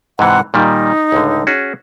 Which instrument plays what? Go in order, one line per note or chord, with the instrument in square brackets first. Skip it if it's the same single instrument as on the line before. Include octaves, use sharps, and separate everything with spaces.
[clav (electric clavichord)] G#2 C3 E3 [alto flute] F#5
[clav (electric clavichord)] A#2 D#3 G3 [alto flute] D#4
[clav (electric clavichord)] C#2 A2 D3
C#4 F#4 G#4